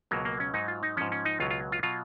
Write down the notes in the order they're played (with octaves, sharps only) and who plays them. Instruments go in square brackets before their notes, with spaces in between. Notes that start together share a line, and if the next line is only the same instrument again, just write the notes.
[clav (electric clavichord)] C#2 B2 F#3 A#3
A#3
C#4
G#2 F#3 D#4
F4
D#4
G#2 F3 C#4
C#4
D#4
C#2 B2 F#3 F4
F4
F4
B2 F#3 F4